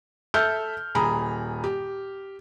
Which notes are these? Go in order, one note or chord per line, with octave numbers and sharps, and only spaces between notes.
A4 E5 F6 G6
D#1 G#4 A#5 B5
G4